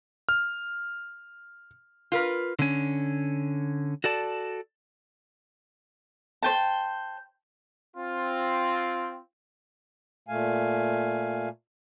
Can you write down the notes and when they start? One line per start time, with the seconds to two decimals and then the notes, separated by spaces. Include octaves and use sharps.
0.29 F6
2.12 F4 A#4 B4
2.59 D3 C#4
4.04 F#4 A4 D5 A5
6.43 C5 G5 A5
7.96 C4 F4
10.28 A#2 A3 F5 G#5